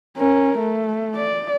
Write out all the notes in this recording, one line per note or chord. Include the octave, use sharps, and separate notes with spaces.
C#4 A#4
A3
D5